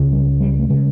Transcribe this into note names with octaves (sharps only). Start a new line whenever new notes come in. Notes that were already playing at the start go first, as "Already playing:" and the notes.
Already playing: C#2 C#3
G3
G3
A3
C#3 G#3